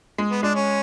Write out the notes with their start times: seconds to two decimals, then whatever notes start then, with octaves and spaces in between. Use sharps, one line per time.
0.18 G#3
0.31 B3
0.43 G#3 D4
0.55 C#4